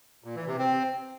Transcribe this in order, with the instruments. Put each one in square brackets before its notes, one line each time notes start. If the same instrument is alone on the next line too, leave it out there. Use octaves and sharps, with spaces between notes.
[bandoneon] A#2
E3
C3
C4